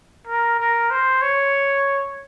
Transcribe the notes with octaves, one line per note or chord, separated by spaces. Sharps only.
A#4
A#4
C5
C#5